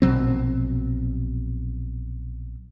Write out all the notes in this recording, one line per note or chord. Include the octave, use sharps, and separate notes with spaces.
A#1 B2 F#3 C4